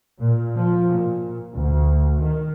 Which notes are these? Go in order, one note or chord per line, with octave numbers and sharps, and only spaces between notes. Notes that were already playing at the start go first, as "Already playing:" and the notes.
A#2
F3
A#2
D2
D#3